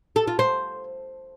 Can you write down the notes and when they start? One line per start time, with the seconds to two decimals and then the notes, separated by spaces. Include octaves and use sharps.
0.16 A4
0.27 F4
0.39 C5